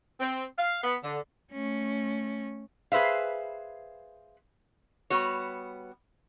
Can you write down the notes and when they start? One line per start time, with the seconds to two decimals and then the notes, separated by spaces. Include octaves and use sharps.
0.20 C4
0.59 F5
0.84 B3
1.03 D3
1.52 A3 C#4
2.92 G#4 B4 C5 E5 F5
5.10 G3 B3 F#4 C#5